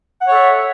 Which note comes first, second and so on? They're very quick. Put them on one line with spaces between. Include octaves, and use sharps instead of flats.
F#5 C#5 A4 E5